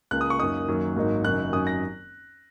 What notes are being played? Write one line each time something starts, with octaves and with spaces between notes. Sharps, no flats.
C#2 C#3 A#3 F#6
D#6
C#6
F#2 F#3 A#3 D#4 D#6
F#2 D#3 F#3 A#3
G#1 G#2 F#3 A#3 D#4
F#1 F#2 D#3 F#3 D#4 F#6
G#1 F#2 F#3 D#4 D#6
A#6